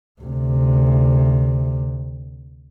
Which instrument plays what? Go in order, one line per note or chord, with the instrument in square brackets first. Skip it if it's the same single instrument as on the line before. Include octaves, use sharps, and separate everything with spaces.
[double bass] D2 C3